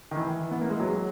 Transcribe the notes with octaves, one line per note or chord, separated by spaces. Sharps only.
D#3
E3
B3
A#3
G#3
F#3